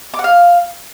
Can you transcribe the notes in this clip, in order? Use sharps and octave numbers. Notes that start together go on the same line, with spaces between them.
D6
F#5
F5